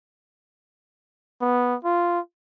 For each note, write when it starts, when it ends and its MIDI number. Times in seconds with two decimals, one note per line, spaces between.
1.41 1.75 59
1.84 2.19 65